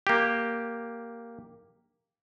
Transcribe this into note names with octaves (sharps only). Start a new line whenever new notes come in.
A#3 G4